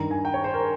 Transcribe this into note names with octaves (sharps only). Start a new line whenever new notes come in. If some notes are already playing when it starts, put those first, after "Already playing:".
Already playing: G2 D#3 A#5
G#5
G5
C#5
C5
A#4